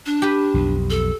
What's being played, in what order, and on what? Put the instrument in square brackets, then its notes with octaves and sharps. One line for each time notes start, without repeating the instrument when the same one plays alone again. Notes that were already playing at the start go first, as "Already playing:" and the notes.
[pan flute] D4
[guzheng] G4 B4
[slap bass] B1 F2
[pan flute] A4